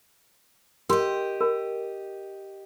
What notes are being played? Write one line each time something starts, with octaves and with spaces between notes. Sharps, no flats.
G4 A#4 D#5 C6
A#4